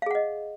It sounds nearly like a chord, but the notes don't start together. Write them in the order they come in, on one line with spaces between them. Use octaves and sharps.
F5 G#4 F#5 D#5